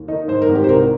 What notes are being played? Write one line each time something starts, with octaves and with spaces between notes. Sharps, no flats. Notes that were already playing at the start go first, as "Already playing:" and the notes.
Already playing: D#2
D#3 D#4
G#2 C5
A#4
G#1
G4
C5
C2 A#4